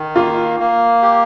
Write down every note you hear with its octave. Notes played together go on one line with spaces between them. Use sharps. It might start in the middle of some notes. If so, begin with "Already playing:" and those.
Already playing: D#3
A#3 F4
A#3
G4